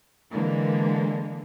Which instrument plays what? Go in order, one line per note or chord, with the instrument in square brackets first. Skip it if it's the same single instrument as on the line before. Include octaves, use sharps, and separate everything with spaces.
[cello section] D3 E3 G#3 A#3